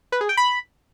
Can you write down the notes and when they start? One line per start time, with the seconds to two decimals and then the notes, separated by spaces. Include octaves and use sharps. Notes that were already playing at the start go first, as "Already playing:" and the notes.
0.12 B4
0.21 G#4
0.29 G5
0.37 B5